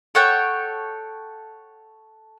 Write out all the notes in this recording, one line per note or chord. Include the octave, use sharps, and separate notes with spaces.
A4 C#5 F#5 G5